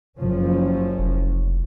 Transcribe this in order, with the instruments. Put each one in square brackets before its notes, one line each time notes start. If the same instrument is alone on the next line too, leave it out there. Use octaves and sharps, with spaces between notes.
[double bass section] F#1 F3 C#4
[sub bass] F1